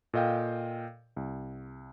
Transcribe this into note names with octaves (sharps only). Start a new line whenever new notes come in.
A#2 A4 D#5 F5 G5
C2